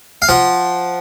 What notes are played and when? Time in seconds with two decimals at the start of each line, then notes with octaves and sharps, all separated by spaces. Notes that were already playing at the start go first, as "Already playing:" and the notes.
0.22 F5
0.29 F3 F#5